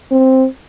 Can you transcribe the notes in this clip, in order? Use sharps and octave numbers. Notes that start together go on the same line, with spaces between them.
C4